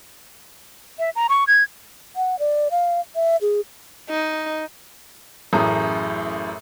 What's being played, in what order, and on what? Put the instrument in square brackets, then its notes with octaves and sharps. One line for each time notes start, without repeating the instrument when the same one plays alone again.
[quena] E5
A#5
C#6
G#6
[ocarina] F#5
D5
F5
E5
G#4
[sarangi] D#4
[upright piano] A1 F#2 A2 G#4 A#5 D#6